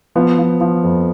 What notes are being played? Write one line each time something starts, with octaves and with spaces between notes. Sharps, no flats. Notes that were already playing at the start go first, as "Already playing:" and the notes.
F3 B3
F3
F3
F2